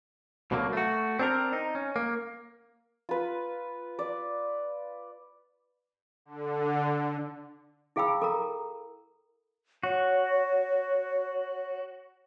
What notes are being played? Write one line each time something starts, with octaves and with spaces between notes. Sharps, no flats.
C2 B2 D3 F#3 G3 A#3
A3 F#4
C4 D4 A#4
D#4
C#4
A#3
F4 B4
D5
D3
E4 G#4 F5 G5 B5 E6
A4 A#4 A#5
F#4 C#5